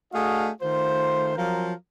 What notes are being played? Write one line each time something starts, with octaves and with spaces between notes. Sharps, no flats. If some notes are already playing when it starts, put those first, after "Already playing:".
A3 D4 F#4 G#4 D#5 F5
D#3 A3 F4 C5
F3 F#3 C4 F4 A#4